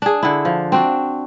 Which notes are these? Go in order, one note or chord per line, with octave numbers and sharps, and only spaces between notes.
D4 G#4
D3 E4
F3
C4 D4 F#4